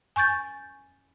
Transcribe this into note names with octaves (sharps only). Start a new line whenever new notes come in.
G#5 C#6 G6 A6